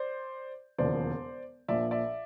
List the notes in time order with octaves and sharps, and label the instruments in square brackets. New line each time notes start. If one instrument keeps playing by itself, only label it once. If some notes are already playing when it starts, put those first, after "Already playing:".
Already playing: [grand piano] C5 D5
E1 D#2 C#3 F3 C5 D5
A#1 A#2 F3 D5 E5
D5 E5